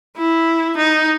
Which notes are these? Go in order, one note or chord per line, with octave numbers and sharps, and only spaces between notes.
E4
D#4